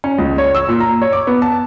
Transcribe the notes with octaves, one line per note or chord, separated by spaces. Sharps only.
C#4
C#2
C#5
E6
A#2
A#5
C#5
D6
B3
A5